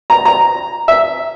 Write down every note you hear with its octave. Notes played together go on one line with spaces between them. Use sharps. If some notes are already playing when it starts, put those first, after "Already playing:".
A#5
A#5
E5